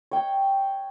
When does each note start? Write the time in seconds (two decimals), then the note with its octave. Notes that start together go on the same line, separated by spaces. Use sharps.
0.11 C#5 G5